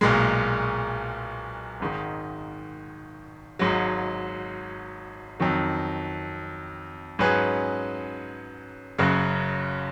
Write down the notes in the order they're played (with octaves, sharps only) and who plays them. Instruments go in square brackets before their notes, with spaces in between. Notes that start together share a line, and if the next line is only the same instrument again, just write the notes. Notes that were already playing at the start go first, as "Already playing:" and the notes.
[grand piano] B1 A#2 G#3
G#1 G#2 D#3
G#1 G#2 F#3
F2 D#3 F#3
G#2 F#3 C#4 G#4 B4
F#1 F#2 C#3 F#3